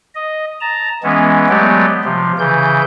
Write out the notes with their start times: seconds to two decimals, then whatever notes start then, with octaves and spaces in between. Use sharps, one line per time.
0.15 D#5
0.61 A5 A#5
1.03 E3 G#3 B3 C#4
1.49 F#3 G#3 A3 B3 G4 D5
2.04 C3 F3
2.39 C#3 E3 G6